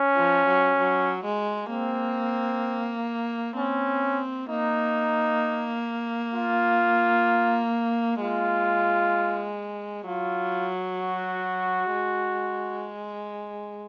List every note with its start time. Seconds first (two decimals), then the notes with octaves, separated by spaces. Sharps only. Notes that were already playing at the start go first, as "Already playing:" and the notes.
Already playing: C#4
0.16 F3
0.47 F#3
0.79 F#3
1.24 G#3
1.70 A#3 C4
3.57 C4 C#4
4.50 A#3 D#4
6.35 F4
8.21 G#3 F4
10.07 F#3 F4
10.99 F#4
11.93 G#3